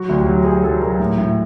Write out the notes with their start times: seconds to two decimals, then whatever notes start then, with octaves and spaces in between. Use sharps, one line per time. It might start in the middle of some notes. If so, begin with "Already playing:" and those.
Already playing: F#3 F#4
0.09 D2
0.18 G4
0.26 F#3
0.41 G4
0.44 F#3 G#4
0.64 F#3 A4
0.81 F#3 A#4
1.00 A2
1.18 A2